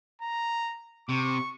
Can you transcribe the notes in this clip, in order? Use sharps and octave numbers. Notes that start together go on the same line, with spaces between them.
A#5
C3 C#6